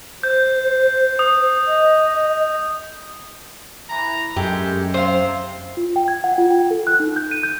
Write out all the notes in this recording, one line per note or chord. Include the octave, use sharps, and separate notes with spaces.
C5 G6
D#6
D#5
E3 A#5
F#2 G#3 A3 G4
C3 C4 C5 F5
F4
G5
G#6
F#5
F4
G5
A4
F#6
D#4
G6
D#7
G6